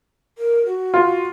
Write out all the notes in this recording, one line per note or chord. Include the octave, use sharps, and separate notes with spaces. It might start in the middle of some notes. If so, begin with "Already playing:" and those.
A#4
F#4
F4